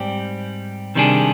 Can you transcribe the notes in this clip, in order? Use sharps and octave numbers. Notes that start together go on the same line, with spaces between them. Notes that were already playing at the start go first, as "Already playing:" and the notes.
Already playing: G#2 G3 C4 G4
C3 D#3 G3 D4 G#4